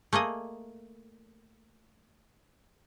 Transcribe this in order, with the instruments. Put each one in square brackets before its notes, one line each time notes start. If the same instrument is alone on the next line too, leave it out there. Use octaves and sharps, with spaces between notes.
[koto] A3 A#3 G#4 D#5